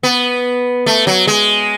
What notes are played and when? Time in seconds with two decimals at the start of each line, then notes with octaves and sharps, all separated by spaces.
0.03 B3
0.86 A3
1.07 F#3
1.27 G#3